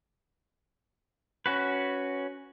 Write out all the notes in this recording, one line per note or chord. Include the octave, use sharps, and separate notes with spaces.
C#4 F#4 B4